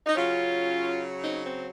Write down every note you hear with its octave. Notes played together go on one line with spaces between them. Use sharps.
D#4
C#3 F#3 C#4 F4
C4 D#4
C4